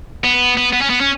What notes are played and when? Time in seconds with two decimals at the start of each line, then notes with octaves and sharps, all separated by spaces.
0.24 B3
0.57 B3
0.73 B3
0.82 C#4
0.90 B3
1.01 C#4